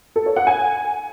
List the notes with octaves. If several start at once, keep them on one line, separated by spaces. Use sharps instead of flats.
A4
C#5
F#5
G#5